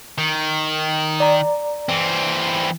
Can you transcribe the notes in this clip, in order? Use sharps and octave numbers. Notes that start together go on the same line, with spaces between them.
D#3
D5 A#5
E3 C4